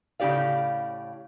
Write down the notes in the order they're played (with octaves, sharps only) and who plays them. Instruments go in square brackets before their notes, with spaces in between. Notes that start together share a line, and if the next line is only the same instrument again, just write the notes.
[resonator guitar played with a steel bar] A2 C#3 C#4 G4 D5 F5